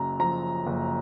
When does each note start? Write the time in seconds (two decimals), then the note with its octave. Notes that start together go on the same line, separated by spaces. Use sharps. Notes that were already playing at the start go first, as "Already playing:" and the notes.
Already playing: F#1 F#2 A#5
0.19 F3 A#5
0.67 F#1